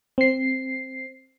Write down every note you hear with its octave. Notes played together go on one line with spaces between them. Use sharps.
C4 C7